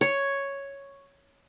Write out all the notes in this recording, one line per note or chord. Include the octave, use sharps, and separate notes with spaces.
C#5